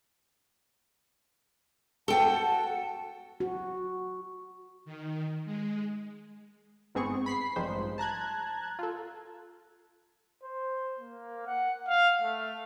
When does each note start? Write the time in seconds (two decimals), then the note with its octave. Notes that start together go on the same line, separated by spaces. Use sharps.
2.08 F#4 A4 F#5 G5 A5
3.40 F#4
4.85 D#3
5.45 G#3
6.95 G1 G#2 B3 C4 G#4 C#6
7.26 B5 B6 C7
7.56 A1 G2 F3 G#3 D#4 C5
7.98 A5 A#5 F#6 G#6
8.79 F4 A4
10.43 C5
10.99 A#3
11.46 F#5
11.88 F5
12.22 A3